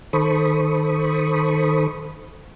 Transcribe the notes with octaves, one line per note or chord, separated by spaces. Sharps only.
D#3 A4 C5 B5 C#6 D#6